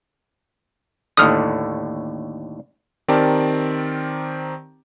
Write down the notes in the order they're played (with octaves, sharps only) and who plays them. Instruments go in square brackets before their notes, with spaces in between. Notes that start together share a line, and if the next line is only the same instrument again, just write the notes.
[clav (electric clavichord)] D#2 A2 D3 [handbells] D#6 F6
[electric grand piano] D#3 C4 G4 A#4 D5 A5